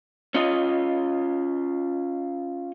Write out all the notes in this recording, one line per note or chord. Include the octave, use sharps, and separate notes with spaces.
C#4 F4 D#5